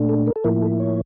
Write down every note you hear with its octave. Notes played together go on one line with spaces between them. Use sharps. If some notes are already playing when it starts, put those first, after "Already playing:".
Already playing: A#2 A3 D4
A4
A#4
A4
A2 F3 A#3 E4 A#4
A4
C#5